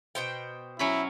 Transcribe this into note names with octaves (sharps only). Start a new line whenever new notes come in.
B2 C5 G5
F#3 C#4 E4 B5